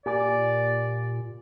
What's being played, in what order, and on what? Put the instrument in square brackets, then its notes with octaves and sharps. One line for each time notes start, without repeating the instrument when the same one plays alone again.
[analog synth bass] A#2 [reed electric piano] G4 G#5 D6 [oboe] D5